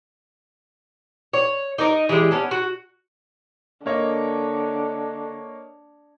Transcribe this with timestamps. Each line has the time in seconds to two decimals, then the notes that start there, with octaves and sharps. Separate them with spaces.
1.33 C#5
1.78 D#4 A#4 C#5 D#5
2.09 E3 G3 G#3
2.31 B3 C#4 D4
2.51 F#4
3.86 D3 A#3 C#5 D#5